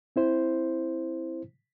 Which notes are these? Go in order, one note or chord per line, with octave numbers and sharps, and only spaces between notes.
C4 E4 C5